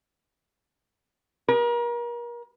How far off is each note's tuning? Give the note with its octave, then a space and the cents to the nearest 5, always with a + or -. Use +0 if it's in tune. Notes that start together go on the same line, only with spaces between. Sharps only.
A#4 +35